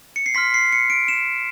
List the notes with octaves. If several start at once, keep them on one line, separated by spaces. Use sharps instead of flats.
C#7
C7
C6 F6 B6
C7
C#7
D7
E7